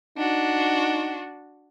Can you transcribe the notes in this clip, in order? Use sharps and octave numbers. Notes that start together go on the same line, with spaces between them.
D4 D#4 F#4